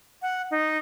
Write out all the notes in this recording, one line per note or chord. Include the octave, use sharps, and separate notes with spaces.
F#5
D#4